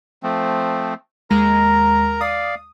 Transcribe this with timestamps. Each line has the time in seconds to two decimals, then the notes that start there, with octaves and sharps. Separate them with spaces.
0.23 F3 A3 C4
1.30 D#2 G#3 A#4 A#5 A#6
2.21 D5 F5 D#6